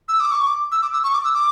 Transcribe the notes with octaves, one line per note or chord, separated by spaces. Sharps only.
E6
D6
C#6
D6
E6
D6
E6
C#6
D6
E6
D6